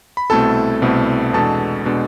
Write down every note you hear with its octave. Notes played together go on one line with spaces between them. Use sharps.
B5
C2 B2 A3 C4 E4 A4 A5
C2 B2 A3 C4 E4
E2 B2 G#3 D4 A4 A5
B2 G#3 D4